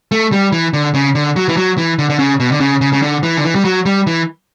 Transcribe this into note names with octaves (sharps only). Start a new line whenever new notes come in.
A3
G3
E3
D3
C#3
D3
F#3
E3
F#3
E3
D3
D3
C#3
B2
D3
C#3
C#3
C#3
D3
E3
D3
E3
G3
F#3
G3
E3